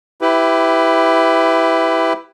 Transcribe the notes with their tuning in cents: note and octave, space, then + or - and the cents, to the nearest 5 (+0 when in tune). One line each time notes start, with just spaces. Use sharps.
E4 +0 G4 +0 B4 +20